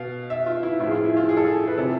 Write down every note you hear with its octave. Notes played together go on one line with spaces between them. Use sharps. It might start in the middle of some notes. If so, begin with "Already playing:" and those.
Already playing: B2 F5
E5
F4
E4
A2 F3 E4
G#4
F4
E4
F4
G#4
A4
G#4
B4
C3 F3 A4